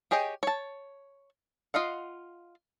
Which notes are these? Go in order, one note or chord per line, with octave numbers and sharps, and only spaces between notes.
G4 G#4 C#5 D#5 G5
C#5 A5
F4 D#5 F5 F#5